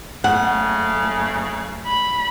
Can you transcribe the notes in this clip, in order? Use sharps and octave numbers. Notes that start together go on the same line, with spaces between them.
F#1 C#3 A3 F#5
B5